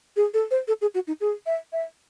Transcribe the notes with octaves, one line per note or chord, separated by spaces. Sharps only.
G#4
A4
C5
A4
G#4
F#4
D#4
G#4
E5
E5